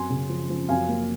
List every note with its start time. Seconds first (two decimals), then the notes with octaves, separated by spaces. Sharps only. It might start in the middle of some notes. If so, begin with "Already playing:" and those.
Already playing: F#2 G#5 C6
0.10 C#3
0.29 F3
0.50 F3
0.69 F#2 F5 G#5
0.89 A#3